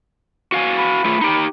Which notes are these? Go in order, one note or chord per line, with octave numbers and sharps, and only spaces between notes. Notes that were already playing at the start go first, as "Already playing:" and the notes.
F#4 F5 G#5
B5
A3 F4 G#4
D#4 G4